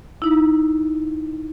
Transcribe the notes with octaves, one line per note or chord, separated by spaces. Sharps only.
D#4 E4